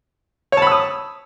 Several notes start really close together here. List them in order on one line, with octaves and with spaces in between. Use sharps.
C#5 A5 B5 E6 D#6